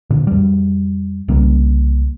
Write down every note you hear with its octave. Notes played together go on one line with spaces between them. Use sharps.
A#2 D3
F2 G3
C2 C#3 G3 A#3